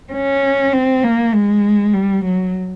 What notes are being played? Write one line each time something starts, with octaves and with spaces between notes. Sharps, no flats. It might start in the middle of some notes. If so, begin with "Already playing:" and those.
C#4
C4
A#3
G#3
G3
F#3